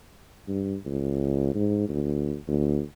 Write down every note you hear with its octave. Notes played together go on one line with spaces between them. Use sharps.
G2
C#2
G#2
D2
D2